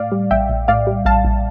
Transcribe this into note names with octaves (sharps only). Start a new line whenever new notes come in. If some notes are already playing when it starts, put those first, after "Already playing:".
Already playing: A2 D5 F5
G3
A#1 E5 G5
A#1
A2 D5 F5
G3
A#1 F5 A5
A#1